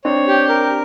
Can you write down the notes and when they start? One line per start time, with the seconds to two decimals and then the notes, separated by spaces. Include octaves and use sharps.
0.04 C4 D4 C#5
0.27 G4
0.49 A#4